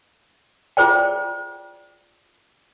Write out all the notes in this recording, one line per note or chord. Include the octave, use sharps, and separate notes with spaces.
F4 G#4 C5 D5 G5